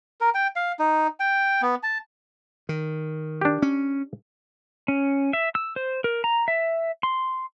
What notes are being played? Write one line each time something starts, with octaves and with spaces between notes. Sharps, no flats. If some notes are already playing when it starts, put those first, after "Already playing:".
A#4
G5
F5
D#4
G5
B3
A5
D#3
D4 G4
C#4
C#4
E5
E6
C5
A#4
A#5
E5
C6